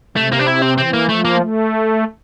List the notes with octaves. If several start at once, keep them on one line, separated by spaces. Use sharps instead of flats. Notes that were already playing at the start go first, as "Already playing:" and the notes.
C3 A3
A#3
D4
E4
C4
E3 C4
A#3
F3 A3
A#3
A3